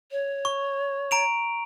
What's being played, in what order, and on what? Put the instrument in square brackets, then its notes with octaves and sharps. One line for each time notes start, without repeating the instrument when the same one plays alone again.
[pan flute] C#5
[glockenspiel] C#6
A#5 D7 F7